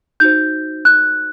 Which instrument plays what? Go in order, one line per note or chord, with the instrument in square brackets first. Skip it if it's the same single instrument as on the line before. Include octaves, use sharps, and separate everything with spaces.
[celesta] D#4 F#4 C5 G6
F#6